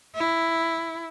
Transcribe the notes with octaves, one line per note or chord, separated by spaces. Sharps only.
E4